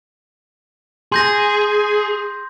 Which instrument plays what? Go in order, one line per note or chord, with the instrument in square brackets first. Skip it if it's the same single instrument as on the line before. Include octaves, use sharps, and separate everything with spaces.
[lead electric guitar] G#4 [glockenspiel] C6 G6 A#6